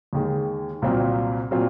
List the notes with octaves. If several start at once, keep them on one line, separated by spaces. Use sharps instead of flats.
D#2 D#3 G#3
C2 A#2 F#3 C4 F4
A#2 F#3 C4 F4